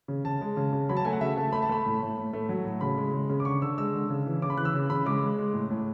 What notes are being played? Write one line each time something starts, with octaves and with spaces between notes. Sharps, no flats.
C#3
C#3 A5
G#3
C#3
C#3
F#3 B5
A5
A3 G#5
F#5
C#3 E5
A3 A5
A3 B5
A5
A3 B5
A2
A2
A2
A3
F#3
A2
C#3 B5
G#3
C#3
C#3
D6
D3 C#6
D3 E6
G#3 E6
D3
C#3
E3
C#3 D6
B5
E3 F#6
E6
C#3
C#3 B5
G#3 D6
G#3
G#3
A2
A2